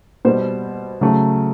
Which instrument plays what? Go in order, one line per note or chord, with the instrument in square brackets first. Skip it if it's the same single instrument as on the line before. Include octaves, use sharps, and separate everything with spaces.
[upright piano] B2 G3 C5
C#3 F#3 A3